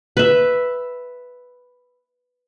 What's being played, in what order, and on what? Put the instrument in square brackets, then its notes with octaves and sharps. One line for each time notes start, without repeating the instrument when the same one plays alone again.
[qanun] B4 E5